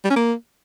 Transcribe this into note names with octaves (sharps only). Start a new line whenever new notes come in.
G3
C#4
A#3